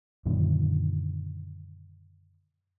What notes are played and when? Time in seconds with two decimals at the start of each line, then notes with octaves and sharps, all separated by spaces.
0.26 F#2 A#2 D3 D#3